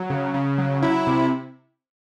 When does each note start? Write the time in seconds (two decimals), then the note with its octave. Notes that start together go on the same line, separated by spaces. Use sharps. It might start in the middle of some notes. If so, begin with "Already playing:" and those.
Already playing: F#3
0.10 C#3
0.34 C#3
0.58 F#3
0.82 F#3 E4
1.07 C3